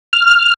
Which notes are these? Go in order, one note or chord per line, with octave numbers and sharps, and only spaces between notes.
F6